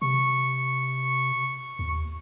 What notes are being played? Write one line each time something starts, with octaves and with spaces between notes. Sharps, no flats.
C3 C#6
D#2